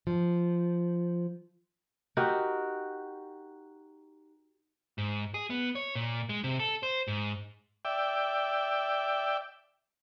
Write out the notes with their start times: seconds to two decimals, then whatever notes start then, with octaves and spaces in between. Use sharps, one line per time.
0.07 F3
2.17 D#4 F#4 G4 A#4
4.98 G#2
5.34 G#4
5.50 B3
5.75 C#5
5.95 A#2
6.29 G#3
6.44 C3
6.59 A4
6.83 C5
7.08 G#2
7.85 D5 E5 G5